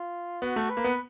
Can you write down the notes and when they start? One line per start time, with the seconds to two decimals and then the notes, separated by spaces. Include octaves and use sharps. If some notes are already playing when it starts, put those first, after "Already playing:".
Already playing: F4
0.42 B3 F#4
0.56 A3
0.70 B4
0.77 A#3
0.84 B3